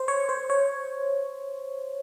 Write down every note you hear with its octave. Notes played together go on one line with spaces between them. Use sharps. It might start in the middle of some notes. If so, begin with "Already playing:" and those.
Already playing: C5
C#5
C5
C#5